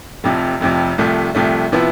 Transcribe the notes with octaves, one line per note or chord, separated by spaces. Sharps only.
F1 F2 C3 F3
F1 F2 C3 F3
C2 C3 F3 A3
C2 C3 F3 A3
C3 F3 B3 E4